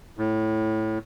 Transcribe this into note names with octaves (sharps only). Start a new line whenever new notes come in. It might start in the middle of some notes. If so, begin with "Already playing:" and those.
A2